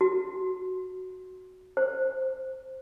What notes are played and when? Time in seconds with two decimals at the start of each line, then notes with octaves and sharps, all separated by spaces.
0.01 F#4
1.77 C5